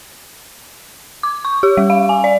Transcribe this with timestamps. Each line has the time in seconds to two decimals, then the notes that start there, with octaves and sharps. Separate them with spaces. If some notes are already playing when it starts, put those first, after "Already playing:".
1.23 D6
1.45 C#6
1.63 G4
1.77 G3
1.90 F5
2.09 G#5
2.24 D5